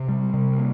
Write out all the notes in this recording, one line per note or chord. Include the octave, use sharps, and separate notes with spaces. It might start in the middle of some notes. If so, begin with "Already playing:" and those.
Already playing: C3
G3
C3
A#3